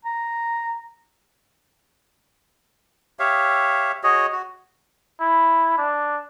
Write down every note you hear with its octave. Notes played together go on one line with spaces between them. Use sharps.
A#5
G4 C#5 E5 F5
F#4 G#4 C#5 D#5
F#4
E4
D4